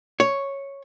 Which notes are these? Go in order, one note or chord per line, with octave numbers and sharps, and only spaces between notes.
C#5